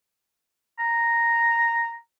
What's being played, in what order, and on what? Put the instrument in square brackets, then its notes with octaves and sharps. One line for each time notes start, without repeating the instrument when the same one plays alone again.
[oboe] A#5